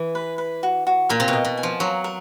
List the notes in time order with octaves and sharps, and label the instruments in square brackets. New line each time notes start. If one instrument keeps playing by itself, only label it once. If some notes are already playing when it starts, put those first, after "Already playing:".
Already playing: [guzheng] E3
[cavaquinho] B4
B4
F#4
F#4
[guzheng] A#2 [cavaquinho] A#4
[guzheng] C3
B2
[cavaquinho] D#5
[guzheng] B2
[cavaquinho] G#5
[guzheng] F3
[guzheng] F#3 [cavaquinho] A#4
[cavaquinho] A#4